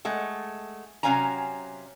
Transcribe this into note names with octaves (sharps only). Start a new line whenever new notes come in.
G#3 A3 F#5
C3 F#3 C#4 F5 G#5 A#5